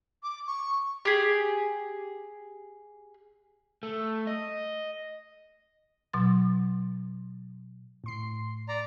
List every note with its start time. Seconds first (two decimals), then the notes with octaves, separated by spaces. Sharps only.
0.23 D6
0.47 C#6
1.05 G4 G#4
3.83 A3
4.27 D#5
6.13 B2 F#3 C6 A6
8.04 A2 C6 C7
8.68 D5 A#5